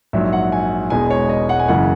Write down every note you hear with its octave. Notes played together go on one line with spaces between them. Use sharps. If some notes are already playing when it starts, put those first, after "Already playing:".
A#1 G#2 F#3 E5
F#5
G#5
E1 E2 B2 G#3 G#5
C#5
D#5
F#5
G#5
F#1 F#2 C#3 E3 F#5